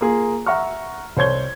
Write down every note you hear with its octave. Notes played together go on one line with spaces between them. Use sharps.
A#3 F4 G#4
E5 F#5 A#5 C#6 F6
C2 C5 C#5 G#6 G7